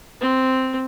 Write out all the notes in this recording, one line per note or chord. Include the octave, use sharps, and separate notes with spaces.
C4